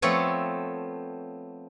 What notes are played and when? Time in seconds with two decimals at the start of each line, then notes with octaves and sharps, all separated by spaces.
0.02 F3 A3 B3 C4 A4 C#5